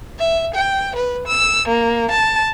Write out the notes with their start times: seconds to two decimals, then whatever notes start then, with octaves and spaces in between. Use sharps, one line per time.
0.19 E5
0.55 G5
0.96 B4
1.28 E6
1.68 A#3
2.11 A5